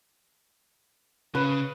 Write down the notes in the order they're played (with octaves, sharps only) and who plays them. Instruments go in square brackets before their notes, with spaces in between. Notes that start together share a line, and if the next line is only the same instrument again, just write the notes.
[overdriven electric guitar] C#3 [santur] B4